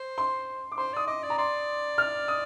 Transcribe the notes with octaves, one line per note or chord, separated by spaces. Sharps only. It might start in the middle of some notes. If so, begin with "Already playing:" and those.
Already playing: C5
C6
D6
C5 C6
D5 D#6
D#5 D6
D5
A#5
D5 C6
F6
D#6